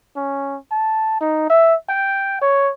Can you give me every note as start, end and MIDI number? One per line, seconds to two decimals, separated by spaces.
0.16 0.57 61
0.71 1.19 81
1.21 1.45 63
1.49 1.74 76
1.89 2.38 79
2.41 2.71 73